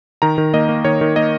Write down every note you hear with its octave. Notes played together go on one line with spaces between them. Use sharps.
D#3 A#5
D#3
A#3 D#5
A#3
D#3 C#5
D#3
A#3 D#5